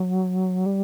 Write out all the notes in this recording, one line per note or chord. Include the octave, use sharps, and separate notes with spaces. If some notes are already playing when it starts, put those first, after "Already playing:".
Already playing: F#3
G3